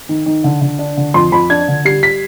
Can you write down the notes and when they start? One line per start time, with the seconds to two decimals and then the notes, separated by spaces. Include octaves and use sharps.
0.09 D#3
0.26 D#3
0.44 D3
0.61 D3
0.79 D4
0.97 D3
1.14 F2 C6
1.32 F2 B5
1.50 D4 G#6
1.68 D3
1.85 G3 C7
2.03 B6